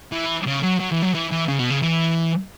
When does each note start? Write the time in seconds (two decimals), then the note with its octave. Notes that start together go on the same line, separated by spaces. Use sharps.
0.12 E3
0.47 C#3
0.64 F#3
0.80 F#3
0.92 E3
1.03 F#3
1.15 E3
1.32 E3
1.48 C#3
1.59 B2
1.70 C#3
1.82 E3